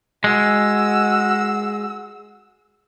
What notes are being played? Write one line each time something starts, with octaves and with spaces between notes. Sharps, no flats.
G#3 F#4 E6